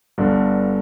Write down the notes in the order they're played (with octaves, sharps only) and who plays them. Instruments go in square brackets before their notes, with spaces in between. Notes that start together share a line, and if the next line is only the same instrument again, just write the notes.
[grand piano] G1 G2 D3